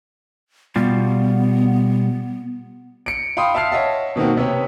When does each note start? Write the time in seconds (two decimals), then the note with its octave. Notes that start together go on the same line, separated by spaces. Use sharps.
0.76 B2 G3 B3 F4
3.06 C#7 D7
3.37 F5 G5 B5 C6 D#6
3.54 E5 F5 A5 F6 C7
3.72 C#5 D#5 E5 F#5 A5
4.16 B2 D#3 A#3 C4 F#4
4.37 C3 B3 C#5